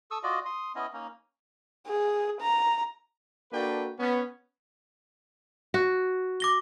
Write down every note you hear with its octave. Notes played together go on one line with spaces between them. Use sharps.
A4 C#6 D#6 E6
F4 F#4 D5 D#5
C6 D#6
B3 C#4 E4 D#5
A#3 C#4 D#4
G#4
A#5
A#3 D4 F#4 A4 B4 G5
B3 C#4
F#4
D6 A#6 G7